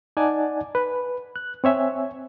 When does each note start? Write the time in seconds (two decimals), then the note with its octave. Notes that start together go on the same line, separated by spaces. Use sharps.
0.17 D#4 D5 F#5 G#5 A5
0.75 B4
1.36 F#6
1.64 C4 C#5 E5 G#5